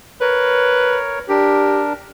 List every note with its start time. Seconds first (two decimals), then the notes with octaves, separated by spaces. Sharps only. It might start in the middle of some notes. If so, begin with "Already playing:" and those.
0.21 A#4 B4 C#5
1.29 D4 G4 A#4